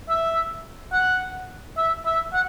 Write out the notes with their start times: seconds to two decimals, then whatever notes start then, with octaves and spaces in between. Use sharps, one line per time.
0.09 E5
0.93 F#5
1.77 E5
2.06 E5
2.33 F#5